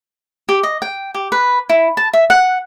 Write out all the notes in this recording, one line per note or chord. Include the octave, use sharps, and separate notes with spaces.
G4
D#5
G5
G4
B4
E4
A5
E5
F#5